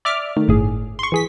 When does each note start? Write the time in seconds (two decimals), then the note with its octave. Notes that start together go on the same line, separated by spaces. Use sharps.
0.05 D5 E5 D6 F6
0.37 D#3 A3
0.48 G1 A2 G#4
0.99 C6 C#6
1.12 E3 G#4 B6